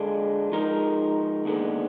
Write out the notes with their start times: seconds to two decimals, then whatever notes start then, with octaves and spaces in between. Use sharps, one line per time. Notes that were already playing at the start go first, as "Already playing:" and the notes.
Already playing: D3 G#3 D4 F4
0.52 F3 G#3 D#4 A#4
1.45 D#2 D3 G#3 B3